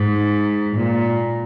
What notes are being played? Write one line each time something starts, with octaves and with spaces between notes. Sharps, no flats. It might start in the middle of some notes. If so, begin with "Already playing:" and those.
Already playing: G#2
A#2